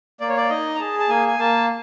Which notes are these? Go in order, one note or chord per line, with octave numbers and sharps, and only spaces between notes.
A#3 D5
C#5
D5
D#4 D#5
A#5
G#4 A5
A5
A#3 G#5
G#5
A#3 A5